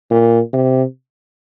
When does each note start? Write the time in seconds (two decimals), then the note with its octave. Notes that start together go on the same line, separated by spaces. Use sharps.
0.10 A#2
0.53 C3